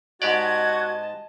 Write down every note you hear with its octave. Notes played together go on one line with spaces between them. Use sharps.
G#2 F#4 G4 D5 D#5 A5 G#6